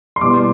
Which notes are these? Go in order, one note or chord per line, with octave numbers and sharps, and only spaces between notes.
C6
B2 G3 B3 E4 D6